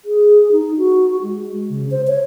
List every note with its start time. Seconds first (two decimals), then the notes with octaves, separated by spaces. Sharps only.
0.05 G#4
0.52 D#4
0.78 F#4
1.23 G#3
1.70 C#3
1.91 C5
2.07 C#5